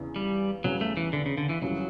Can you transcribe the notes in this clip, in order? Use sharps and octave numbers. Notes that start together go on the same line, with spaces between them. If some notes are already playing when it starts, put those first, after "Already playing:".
Already playing: E2 C#3 E3
G3
E2 C#3 F#3 G3 B3
A3
E3
D3
C#3
D3
E3
F#2 C#3 E3 F#3 G3